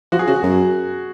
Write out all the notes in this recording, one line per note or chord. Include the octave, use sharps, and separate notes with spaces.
F3 F#4
G#4
C#3 F#4
F#2